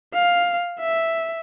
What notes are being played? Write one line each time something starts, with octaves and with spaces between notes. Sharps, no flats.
F5
E5